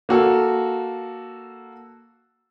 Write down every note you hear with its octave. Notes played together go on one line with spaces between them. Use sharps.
A#3 F#4 A4